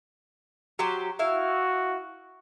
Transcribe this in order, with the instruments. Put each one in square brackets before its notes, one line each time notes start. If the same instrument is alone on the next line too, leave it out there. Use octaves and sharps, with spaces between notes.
[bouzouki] F#3 G4 C5
[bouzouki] E4 F5 [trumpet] F#4